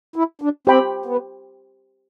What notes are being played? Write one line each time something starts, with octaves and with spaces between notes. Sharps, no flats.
E4
D4
C4 G4 C5 G5 B5
B3